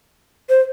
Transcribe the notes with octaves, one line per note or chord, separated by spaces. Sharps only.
C5